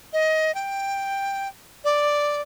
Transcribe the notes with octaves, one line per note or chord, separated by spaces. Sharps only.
D#5
G5
D5